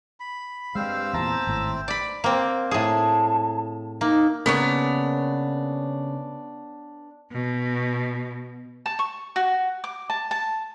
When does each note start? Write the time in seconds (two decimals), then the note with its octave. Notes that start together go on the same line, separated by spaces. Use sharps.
0.20 B5
0.75 G2 G#3 C4 C5 F5 E6
1.14 E2 A#2 E5 A5 A#5
1.47 G#1 A2
1.88 D5 B5
2.24 A#3 C4
2.71 A2 G#4 A5
4.01 A#3 D#4
4.46 C#3 A#3 B3 D4 A#4 C#5
7.33 B2
8.86 A5
8.99 C#6
9.36 F#4
9.84 D6
10.10 A5
10.31 A5